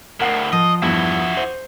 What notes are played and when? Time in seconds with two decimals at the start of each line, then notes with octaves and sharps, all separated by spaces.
0.20 D2 A2 A#4 F#5 C7
0.53 F3 D#5
0.82 E2 G2 E4 F#4
1.37 C5